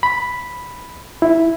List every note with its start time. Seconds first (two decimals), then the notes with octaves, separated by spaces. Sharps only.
0.03 B5
1.22 E4